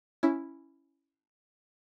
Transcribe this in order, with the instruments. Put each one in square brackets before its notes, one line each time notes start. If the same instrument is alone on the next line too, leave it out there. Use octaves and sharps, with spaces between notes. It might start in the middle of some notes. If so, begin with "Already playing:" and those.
[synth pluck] C#4 E4